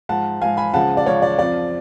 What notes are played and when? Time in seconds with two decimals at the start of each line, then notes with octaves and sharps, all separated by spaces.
0.09 G#2 F3 F#5 A5
0.41 G#2 F3 F5 G#5
0.57 G#5 B5
0.74 C#2 C#3 F3 F#5 A5
0.97 D5
1.06 C#2 C#3 F3 C#5
1.22 D5
1.39 F2 F3 D5